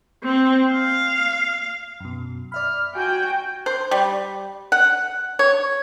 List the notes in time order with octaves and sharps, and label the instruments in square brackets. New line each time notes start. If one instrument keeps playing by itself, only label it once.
[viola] C4
F5
[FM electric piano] F#2 B2
[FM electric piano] D5 E5 B5 [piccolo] F6
[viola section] F#4 G5 [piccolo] G#5
[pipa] C5
G3
F#5
C#5